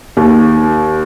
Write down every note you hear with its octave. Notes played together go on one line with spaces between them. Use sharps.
D#2